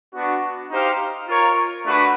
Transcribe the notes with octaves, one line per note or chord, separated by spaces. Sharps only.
B3 D4 F#4
D#4 G4 C5 F5
F4 A#4 C#5
A3 D4 F#4 B4